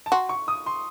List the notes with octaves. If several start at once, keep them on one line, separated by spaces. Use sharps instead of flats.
A5
F#4 C6
C#6
D#6
C6